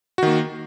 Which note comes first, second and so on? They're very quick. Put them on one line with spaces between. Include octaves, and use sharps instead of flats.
F#4 D#3 A#3